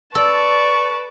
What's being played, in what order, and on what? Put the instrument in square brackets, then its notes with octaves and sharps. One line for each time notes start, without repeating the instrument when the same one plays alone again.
[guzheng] A4 [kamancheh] B4 A5 [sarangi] D5 [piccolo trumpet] C#6